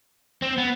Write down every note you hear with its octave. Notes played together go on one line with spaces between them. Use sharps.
C4
B3